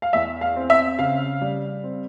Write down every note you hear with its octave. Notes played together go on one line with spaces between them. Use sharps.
F5
E2 E5
F5
C4
E5
C#3 F5
G3
C4